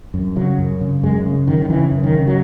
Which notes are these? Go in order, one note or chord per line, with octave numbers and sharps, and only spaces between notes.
F#2
C#3 F#3
F#2
C#3
F#2 G#3
C#3
F#2 D#3
D#3
C#3 E3
F#2
D#3
C#3
F#3